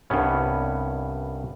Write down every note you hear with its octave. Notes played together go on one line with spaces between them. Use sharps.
C2 G2 B3 C#4